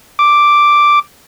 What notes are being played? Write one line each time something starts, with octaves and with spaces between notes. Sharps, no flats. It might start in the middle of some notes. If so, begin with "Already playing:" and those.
D6